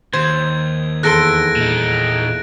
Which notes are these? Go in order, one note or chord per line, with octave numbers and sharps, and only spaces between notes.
D#2 C5 G#6
E2 A4 C6 F#6 A#6 D7
A#2 D#4